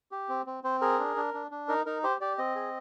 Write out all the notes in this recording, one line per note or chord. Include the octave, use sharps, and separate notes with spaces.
G4
C4
C4
C4 C5
G#4 A#4
D4
D4
D4
D4
D#4 A#4
D#4 A#4
G4 C5
G4 D5
C4 D#5
G#4